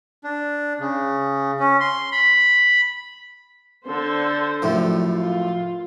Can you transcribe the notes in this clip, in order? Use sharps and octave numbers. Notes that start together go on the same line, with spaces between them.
D4
C#3
C#4
C6
B5
D3 A4 C5
F#2 A2 F3
F4